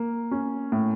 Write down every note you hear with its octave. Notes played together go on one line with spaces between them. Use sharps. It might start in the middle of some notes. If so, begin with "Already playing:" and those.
Already playing: A#3
C#4
A2